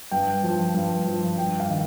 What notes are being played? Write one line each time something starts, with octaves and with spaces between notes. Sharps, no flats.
G2 G5
F3
G2
F3
G2 G5
F5
D#3